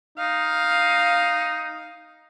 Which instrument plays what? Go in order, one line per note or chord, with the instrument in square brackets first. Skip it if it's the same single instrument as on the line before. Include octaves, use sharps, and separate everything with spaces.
[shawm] D#4 [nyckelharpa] F5